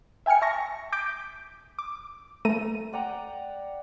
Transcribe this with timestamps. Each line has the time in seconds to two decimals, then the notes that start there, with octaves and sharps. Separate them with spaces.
0.26 E5 G5 G#5 F6 C#7
0.42 E5 A5 C#6 A#6
0.92 D6 G6 B6 D7
1.79 D6
2.45 A3 A4 A#5 D#7
2.93 D5 F#5 G5 A#5